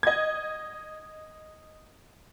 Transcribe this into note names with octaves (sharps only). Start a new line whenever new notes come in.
D#5 G#6